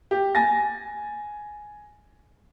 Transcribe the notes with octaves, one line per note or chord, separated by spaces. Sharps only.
G4
G#5 A6 A#6